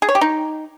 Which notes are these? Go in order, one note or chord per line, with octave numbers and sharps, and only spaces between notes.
G#4
C#5
G4
D#4